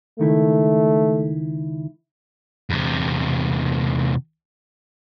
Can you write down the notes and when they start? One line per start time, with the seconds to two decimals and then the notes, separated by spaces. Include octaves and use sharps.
0.20 C#2 D#3 A3 E4
2.71 E2 C3